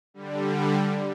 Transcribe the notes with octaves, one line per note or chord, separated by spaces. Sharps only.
D3 G3